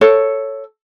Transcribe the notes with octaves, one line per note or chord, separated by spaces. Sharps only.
A4 C#5